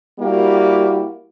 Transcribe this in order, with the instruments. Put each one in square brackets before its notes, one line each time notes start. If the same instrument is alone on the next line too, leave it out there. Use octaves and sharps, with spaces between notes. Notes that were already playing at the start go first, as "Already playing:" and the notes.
[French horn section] G3 A#3 E4 F#4 G4